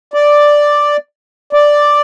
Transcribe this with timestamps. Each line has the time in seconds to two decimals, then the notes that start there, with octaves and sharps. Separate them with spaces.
0.14 D5
1.53 D5